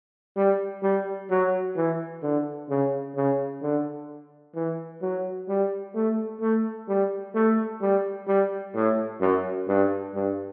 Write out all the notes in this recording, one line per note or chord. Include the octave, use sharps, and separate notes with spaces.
G3
G3
F#3
E3
D3
C#3
C#3
D3
E3
F#3
G3
A3
A3
G3
A3
G3
G3
A2
F#2
G2
G2